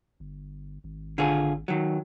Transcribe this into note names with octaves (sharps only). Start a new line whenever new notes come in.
G1
G#1
D3 F4 G#4
D#3 F#3